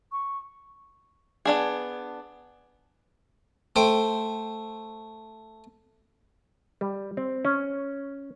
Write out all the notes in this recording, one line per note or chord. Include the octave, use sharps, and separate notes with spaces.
C#6
B3 D4 G#4
A3 C5 G5
G3
C4
C#4